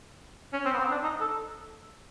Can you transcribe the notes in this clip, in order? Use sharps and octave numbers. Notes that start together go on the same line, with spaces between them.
C#4
C4
B3
C4
D4
D#4
A4